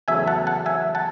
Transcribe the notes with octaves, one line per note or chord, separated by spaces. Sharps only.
E2 C#3 F#3 A3 E5 G#5
F#5 A5
F#5 A5
E5 G#5
F#5 A5